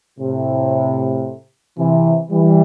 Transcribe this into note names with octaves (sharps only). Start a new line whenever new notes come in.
A2 C3
C3 E3
E3 G3